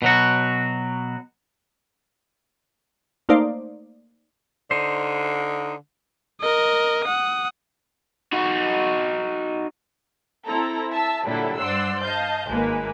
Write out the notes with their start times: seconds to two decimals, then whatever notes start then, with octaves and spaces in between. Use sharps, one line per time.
0.02 B2 F#3 F#4
3.29 A3 A#3 D#4 C5 D5 F5
4.71 D3 D#4 C5
6.41 A#4 D#5
7.04 F#5 D#6
8.33 D#4 F#4
10.47 C4 E4 A4 A#5
10.91 E5 A5 E6
11.26 A#2 D3 F#3 G3 E4 A4
11.58 G2 C5 D5 F#5 C6 E6
12.02 D#5 F5 A5 G6
12.48 G#1 G#3 A#3 B4